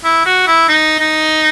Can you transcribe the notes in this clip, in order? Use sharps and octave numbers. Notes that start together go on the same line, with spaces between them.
E4
F#4
E4
D#4
D#4